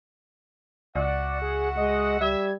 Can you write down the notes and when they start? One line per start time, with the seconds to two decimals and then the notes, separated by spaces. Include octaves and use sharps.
0.96 C#2 F#4 D5 E5 F#5
1.42 G#4
1.77 G#3 D#5
2.21 G3 E5 G#6